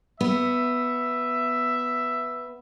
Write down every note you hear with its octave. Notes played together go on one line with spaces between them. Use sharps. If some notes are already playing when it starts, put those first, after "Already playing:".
B3 E5